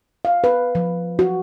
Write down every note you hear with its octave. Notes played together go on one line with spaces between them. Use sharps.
F5
B4
F3
F#4